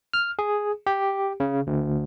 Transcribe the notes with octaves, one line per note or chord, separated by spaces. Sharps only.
F6
G#4
G4
C#3
D2